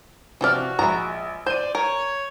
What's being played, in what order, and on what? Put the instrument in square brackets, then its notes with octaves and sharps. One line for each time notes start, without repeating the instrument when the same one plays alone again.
[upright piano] C3 F6 [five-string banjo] E3 F3 D5 [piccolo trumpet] F#4
[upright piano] A#1 B5 [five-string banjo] G#3 A#5
[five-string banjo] C5 [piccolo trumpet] D5 [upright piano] G6 D#7
[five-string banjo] A#4 [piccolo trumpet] C#5